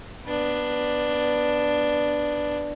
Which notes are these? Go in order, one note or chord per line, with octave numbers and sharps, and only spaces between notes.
B3 D4